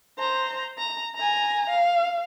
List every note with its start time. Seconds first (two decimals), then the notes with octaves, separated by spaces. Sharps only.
0.19 C5 A#5
0.78 A#5
1.16 G#5 A#5
1.70 F5